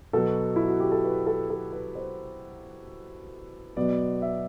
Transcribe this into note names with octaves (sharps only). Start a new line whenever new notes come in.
B2 F#3 B3 A4
E4
F#4
G4
A4
B4
A4
A4
B4
C5
B2 F#3 B3 D5
E5